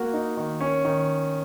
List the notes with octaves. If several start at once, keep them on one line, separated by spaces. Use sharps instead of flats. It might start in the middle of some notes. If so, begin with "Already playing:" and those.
Already playing: A#3 F#4
D#4
D#3
C#4
D#3